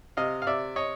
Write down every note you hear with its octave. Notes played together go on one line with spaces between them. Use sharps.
C3 D#5 F5
F5
C3 D5 E5
C#5 D#5